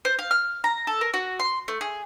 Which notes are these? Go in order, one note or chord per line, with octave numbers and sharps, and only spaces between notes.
C5
F5
F6
A#5
A4
A#4
F#4
C6
A3
G#4